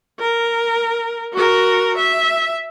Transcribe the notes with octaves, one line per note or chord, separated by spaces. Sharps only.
A#4
F#4 A#4
E5